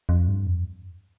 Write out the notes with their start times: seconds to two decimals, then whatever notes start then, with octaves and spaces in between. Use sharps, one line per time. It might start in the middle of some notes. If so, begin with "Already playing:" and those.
0.09 F2
0.28 G2
0.47 F2